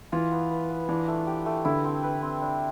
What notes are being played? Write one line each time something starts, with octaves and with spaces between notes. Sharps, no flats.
E3 F4
B3
B4
B3
E3 D4
A3
G4
A3
D3 E4
C4
B4
C4
D4